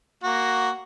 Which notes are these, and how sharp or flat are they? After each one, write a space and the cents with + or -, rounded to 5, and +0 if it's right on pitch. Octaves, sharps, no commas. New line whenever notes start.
A#3 +0 F#4 +5